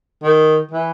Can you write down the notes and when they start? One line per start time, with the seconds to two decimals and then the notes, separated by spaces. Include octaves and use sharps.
0.23 D#3
0.71 E3